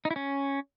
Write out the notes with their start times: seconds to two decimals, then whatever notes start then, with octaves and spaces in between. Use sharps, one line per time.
0.05 D#4
0.11 E4
0.16 C#4